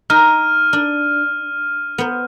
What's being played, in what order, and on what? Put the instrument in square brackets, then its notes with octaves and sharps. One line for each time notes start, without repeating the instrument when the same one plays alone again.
[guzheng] D#4 [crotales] F6 D#7
[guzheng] D4
B3 C5